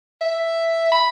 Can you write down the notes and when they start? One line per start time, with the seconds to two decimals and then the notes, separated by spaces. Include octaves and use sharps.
0.21 E5
0.92 B5